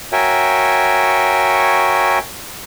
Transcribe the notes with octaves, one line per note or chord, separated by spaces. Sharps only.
F#4 A#4 C#5 E5 G5 G#5